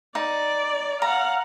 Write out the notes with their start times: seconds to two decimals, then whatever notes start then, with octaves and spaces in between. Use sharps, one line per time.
0.15 D#4 D5
1.02 F5 F#5 A#5